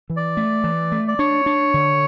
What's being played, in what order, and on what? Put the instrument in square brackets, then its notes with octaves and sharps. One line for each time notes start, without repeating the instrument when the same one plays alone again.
[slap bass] E3
[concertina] D5
[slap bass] A3
E3
A3
[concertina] D5
[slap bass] D4 [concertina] C#5
[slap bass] D4
D3